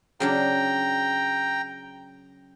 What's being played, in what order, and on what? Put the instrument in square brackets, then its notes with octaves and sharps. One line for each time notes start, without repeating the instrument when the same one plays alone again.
[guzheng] C#3 F#3 D4 [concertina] G5 A#5